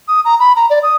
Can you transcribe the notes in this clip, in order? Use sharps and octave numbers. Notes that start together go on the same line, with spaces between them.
D#6
A#5
B5
A#5
D5
D#6